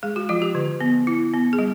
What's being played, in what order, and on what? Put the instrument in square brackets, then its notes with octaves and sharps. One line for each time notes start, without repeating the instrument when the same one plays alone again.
[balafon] G#3 G#4
F#4
F3 F4
G4
D3
B3
E4
B3
G#4
G3